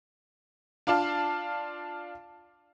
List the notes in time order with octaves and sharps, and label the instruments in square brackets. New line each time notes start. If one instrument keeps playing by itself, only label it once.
[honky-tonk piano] D4 F4 D5 F5 A5